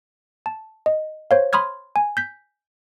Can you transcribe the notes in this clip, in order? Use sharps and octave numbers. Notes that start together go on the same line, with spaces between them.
A5
D#5
C5 C#5 F5
B5 C6 D#6 F6 G#6
G#5
G6 B6